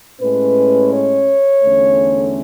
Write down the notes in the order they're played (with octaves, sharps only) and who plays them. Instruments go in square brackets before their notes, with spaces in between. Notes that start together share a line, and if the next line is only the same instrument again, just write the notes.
[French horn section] A2 G#3 C#4 B4
C#5
E2 D3 A3 C#4